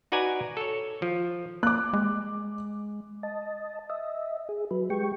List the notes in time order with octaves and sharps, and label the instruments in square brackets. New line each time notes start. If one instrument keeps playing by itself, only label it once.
[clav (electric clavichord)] D#4 F#4 B4 D5 G#5 A#5
A4 C#5
F3
[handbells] A#3 [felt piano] D6 F#6
[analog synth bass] G#3
[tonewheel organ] D#5 A5
D#5 E5
G#4
F#3 B4
G#3 G4 G5 C#6